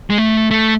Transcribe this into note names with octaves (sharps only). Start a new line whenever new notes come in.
G#3
A3
A3